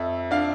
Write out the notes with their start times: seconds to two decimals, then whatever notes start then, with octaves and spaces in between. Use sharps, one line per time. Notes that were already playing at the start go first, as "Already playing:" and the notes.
Already playing: F2 E5
0.31 D4 F5